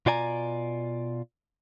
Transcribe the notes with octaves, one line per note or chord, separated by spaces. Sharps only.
B2 F4 D5 G#5 A#5